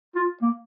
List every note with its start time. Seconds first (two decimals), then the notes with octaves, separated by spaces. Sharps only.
0.15 F4
0.42 A#3